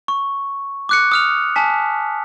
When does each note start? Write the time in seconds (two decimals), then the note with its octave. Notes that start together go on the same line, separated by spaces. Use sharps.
0.08 C#6
0.89 D6 F#6 C#7
1.11 D#6 F6 F7
1.56 G#5 A5 B6